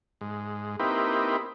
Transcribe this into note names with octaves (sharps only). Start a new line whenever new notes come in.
G#2
A#3 C4 D#4 E4 G4 B4